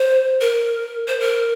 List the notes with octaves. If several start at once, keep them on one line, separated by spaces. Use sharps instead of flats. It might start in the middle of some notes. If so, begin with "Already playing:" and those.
Already playing: C5
A#4
C5
A#4